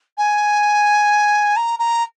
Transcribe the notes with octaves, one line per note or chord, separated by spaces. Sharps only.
G#5
A#5
A#5